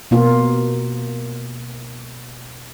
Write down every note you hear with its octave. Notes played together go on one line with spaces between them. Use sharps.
B2 A#3 F4